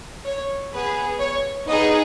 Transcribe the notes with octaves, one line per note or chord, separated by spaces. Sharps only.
C#5
B3 G#4 B4
C#5
B3 D#4 G#4 D#5